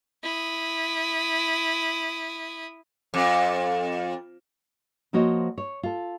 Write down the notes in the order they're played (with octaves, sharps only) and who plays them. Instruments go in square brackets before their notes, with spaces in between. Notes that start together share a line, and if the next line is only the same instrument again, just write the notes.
[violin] E4 D#6
[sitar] F2
[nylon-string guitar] F3 A#3 F#4 C5 C#5 D#5
C#5
F4 A4